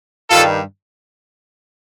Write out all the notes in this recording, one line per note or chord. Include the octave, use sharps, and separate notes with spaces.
G2 D#3 G3 F4 A4